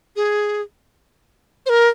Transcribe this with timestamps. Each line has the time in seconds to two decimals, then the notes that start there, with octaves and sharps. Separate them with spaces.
0.16 G#4
1.66 C5
1.69 A#4